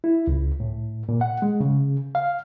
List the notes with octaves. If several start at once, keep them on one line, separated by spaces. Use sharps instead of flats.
E4
C#2
A2
A#2
F#5
G#3
C#3
F5